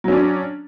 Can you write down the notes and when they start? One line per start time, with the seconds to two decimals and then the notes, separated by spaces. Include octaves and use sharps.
0.04 F#3
0.08 C#4
0.12 D4